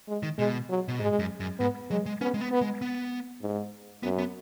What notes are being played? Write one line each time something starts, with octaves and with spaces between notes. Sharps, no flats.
G#3
D#3
B2 G#3
F#3
B2
G#2 G#3
F#2
F#2
G#2 B3
F#3 G#3
G#3
B3 C#4
G#3
B3
B3
G#3
B3
G#2
F#2 B3
B3